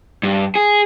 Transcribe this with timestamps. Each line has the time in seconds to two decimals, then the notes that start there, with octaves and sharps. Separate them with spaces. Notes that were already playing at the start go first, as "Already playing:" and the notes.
0.23 G2
0.55 G#4